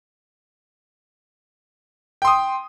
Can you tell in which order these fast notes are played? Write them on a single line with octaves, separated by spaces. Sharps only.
G5 C6 D#6